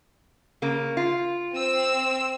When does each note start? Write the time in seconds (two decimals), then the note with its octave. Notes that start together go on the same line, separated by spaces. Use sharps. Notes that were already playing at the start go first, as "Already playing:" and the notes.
0.62 C#3 A#3
0.97 F4
1.54 C4 E6